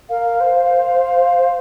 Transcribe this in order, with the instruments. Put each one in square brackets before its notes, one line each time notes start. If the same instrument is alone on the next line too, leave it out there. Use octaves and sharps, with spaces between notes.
[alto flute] A#4 [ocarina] F5
[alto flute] C5